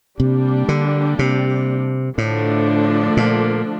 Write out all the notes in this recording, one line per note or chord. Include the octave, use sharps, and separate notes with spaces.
C3 G3 A#3 D4 G4
D3
C3
A2 D3 F3 A3 D4
A#2